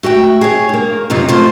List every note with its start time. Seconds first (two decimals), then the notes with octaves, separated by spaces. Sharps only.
0.03 A3 F#4 E5 G5
0.41 G#4 C#5
0.69 G2 A#3
1.10 F#2 C3 D#4 F4
1.28 F3 A3 F4 C5